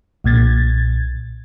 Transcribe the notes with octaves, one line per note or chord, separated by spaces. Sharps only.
B1 A#2 G#6 A6